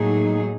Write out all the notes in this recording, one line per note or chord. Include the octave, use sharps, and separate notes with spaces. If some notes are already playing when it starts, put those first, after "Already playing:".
Already playing: A2 F#3 A#3 D#4 G#4